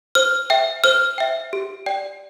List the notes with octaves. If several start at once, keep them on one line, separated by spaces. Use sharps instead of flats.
C5 F6
E5 G5
C5 F6
E5 G5
G4
D5 G5